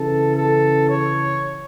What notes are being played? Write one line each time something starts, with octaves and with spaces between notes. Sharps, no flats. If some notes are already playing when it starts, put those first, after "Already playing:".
Already playing: C#3 E3 A4
A4
C#5